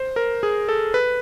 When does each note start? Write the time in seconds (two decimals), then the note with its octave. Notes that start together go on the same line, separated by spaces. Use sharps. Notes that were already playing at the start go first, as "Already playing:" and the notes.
Already playing: C5
0.16 A#4
0.43 G#4
0.69 A4
0.94 B4